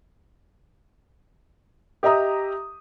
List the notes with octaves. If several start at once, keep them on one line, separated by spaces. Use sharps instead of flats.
G4 D#5 E5 A#5 D#6